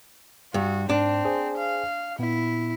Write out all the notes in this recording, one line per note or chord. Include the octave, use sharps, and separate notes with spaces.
G2 F#4
G#2 C4 D4
G#4 C5 G#5
F5
A#2 B3 E4